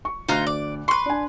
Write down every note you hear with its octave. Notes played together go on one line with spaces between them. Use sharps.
C#6
D2 D#4 F4 A#5 F#6
D5
B4 C6 C#6
D4 G#5